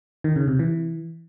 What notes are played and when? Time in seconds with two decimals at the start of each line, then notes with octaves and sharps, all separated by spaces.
0.24 D#3
0.36 C#3
0.48 C3
0.59 E3